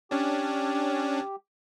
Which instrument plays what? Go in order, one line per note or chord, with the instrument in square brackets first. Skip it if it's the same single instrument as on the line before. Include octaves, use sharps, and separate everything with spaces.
[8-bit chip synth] C#4 D4 [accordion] G4